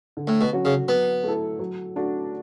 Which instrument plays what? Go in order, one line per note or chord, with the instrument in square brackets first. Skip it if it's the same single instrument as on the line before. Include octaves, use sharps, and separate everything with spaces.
[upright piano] D3
[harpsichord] A2
B2
[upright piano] F#3 C#4 F#4
[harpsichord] C#3
[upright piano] F#3 [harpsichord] B3
[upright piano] A3 E4 A4
F#3
A3 D4 F#4